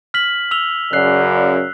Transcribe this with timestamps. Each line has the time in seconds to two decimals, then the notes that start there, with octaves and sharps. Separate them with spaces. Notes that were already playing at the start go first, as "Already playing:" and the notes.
0.14 F6 B6 F#7
0.51 E6 F7 G7
0.93 F#2 C#3 D5 F#6 C7